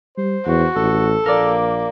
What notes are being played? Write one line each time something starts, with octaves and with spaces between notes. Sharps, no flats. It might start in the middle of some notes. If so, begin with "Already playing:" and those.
G3 C5
E2 F#4
A1 A4
A#1 A#3 A#4 D5